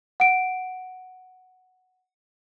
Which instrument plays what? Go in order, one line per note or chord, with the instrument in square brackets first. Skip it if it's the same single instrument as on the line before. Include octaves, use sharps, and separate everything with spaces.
[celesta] F#5 D7